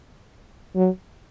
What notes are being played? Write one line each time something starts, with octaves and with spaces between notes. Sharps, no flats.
F#3